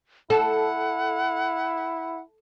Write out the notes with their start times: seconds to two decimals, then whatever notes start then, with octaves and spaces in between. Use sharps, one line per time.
0.30 E4 A4 F#5